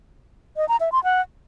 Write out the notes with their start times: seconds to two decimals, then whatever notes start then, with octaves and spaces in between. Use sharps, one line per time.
0.57 D#5
0.68 A#5
0.80 E5
0.92 C6
1.04 F#5